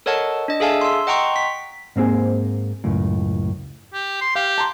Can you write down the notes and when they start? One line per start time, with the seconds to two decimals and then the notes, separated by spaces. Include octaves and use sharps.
0.06 A4 A#4 C#5 D#5 F#5 A5
0.48 D4 D#5
0.60 G#4 A4 E5 F5 G#5 A5
0.81 C6 E6
1.07 D#5 F#5 G5 A#5 C6 C#6
1.36 B6
1.96 G#2 A#3 C4 G#4
2.84 C#2 F#2 A2
3.93 G4
4.21 C6
4.36 G4 F5
4.58 A5 A#5 C6